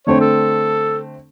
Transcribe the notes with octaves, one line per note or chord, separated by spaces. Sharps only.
D3 A3 C4 C#5
A4